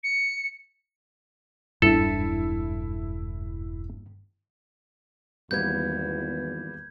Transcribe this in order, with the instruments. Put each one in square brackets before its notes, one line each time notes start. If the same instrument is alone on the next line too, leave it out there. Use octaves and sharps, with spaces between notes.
[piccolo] C#7
[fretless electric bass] E1 D4 [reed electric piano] G2 [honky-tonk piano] E4 [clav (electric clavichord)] A4
[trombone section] G#1 E2 [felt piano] G3 A#3 B3 [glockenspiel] G6 G#6